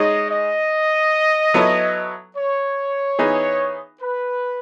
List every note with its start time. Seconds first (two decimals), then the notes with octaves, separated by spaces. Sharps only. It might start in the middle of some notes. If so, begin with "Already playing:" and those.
Already playing: G#3 D#4 G#4 C#5 D#5
0.31 D#5
1.54 F#3 B3 E4 A4 C#5
2.36 C#5
3.19 E3 B3 D#4 G#4
4.01 B4